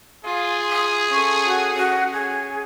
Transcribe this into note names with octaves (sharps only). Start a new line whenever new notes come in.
F4 G#4
D#6
C#4 A4 C#6
F#4
C#4 F#4
G#4